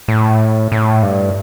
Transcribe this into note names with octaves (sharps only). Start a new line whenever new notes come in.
A2
A2
G2